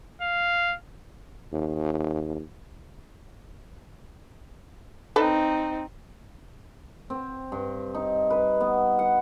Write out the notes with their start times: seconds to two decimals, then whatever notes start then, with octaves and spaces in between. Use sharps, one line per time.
0.22 F5
1.52 D#2
5.16 C4 D#4 A4 B4
7.10 C4
7.52 G2
7.95 D#4
8.30 B4
8.61 B3
8.99 F#5